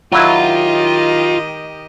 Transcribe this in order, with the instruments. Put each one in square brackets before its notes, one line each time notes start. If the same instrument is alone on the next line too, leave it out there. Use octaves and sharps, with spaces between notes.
[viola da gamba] D#3 G4 D#5 [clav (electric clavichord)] F#3 E4 [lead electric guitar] F4